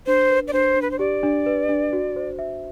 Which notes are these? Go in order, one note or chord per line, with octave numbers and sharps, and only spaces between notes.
D4 C5
B4
D5
D4 C5
D4
B4
C5
G4 D5
D4
B4
D4
F#4
C5
E5